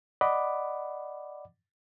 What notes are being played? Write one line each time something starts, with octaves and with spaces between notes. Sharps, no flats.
D5 D#5 F#5 B5 D6